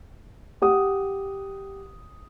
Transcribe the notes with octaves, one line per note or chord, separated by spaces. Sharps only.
G4 F#5 D#6